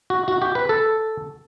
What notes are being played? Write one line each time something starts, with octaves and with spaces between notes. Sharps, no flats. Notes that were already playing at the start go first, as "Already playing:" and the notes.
F#4
F#4
G4
B4
A4